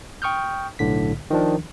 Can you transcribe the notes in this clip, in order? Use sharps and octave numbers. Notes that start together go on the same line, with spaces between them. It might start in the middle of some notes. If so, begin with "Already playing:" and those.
G5 C#6 D#6 F6 G6
B1 A2 D3 B6
D#3 F3 D4